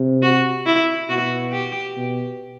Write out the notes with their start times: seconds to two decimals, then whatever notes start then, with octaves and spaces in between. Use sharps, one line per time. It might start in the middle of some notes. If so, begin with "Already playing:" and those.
Already playing: C3
0.22 F#4
0.66 E4
1.09 B2 F#4
1.53 G4
1.97 B2